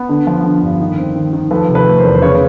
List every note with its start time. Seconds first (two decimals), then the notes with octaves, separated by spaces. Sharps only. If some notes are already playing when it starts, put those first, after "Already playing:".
Already playing: B3
0.09 D3
0.27 F3
0.44 D3
0.63 G2
0.80 D#3
0.98 C4
1.16 D#3
1.33 D#3
1.51 F3 A4 B4
1.69 C3
1.75 A4 B4
1.86 A3
1.99 A#4 C5
2.04 E2
2.15 C5
2.22 C#3 B4 C#5